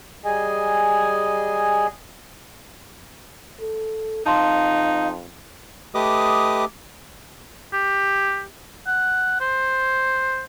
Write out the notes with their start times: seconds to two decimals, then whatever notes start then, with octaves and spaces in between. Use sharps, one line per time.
0.25 G3 G#4 D#5 G#5
3.61 A4
4.26 F2 D#4 F5 A5 C6
5.95 A3 G4 B4 D#5 D6 D#6
7.73 G4
8.87 F#5
9.41 C5